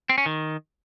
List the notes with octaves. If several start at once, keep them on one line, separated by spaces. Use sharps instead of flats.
C4
C#4
D#3